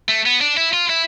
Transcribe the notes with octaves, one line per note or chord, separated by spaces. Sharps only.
A3
B3
D4
E4
F4
E4